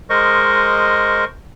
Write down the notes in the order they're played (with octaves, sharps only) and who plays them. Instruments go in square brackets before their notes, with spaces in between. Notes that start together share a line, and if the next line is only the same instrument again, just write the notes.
[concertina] G#3 A#4 C5 D#5 C#6